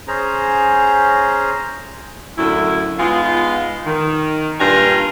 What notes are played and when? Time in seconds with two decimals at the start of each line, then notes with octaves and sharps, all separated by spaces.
0.08 C#4 G#4 C5 A#5
2.37 F#2 A2 D3 E4
2.98 G#3 B3 D#4 F4
3.86 D#3
4.59 G2 A#2 F4 G#5 A#5